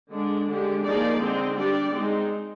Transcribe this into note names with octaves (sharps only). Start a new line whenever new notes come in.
D3 G#3 D4
D3 G#3 D4 G4
F3 A#3 D#4 G#4 D5
D3 G#3 C4 D#4
G3 D4 G4 D5
G#3 C4 D#4